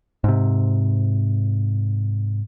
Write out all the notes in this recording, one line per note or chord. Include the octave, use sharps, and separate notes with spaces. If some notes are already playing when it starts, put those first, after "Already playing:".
G#2 C3